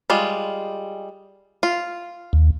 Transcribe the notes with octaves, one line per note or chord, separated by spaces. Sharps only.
G3 G#3 F4
F4
D#2